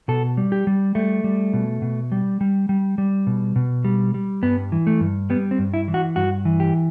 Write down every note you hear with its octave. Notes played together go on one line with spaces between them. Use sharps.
B2 A4
G3
G4
G3
G3 A3
G3
B2
B2
G3
G3
G3
G3
B2
B2
G3
G3
G2 B3
E3
A3
G2
G3 B3
C4
G2
E4
E3
F#4
G2 F#4
E3
G4